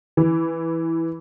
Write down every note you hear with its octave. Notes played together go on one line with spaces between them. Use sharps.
E3